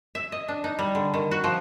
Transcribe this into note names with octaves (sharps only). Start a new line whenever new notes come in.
E5
D#5
D4
D#4
G3
D3
D#3
F#4
F3